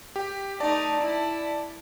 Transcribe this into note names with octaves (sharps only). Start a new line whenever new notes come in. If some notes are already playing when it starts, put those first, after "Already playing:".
G4
A3 D#4 D5 A5
E4